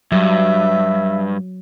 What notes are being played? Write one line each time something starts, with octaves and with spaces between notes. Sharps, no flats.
G2 F#3 E5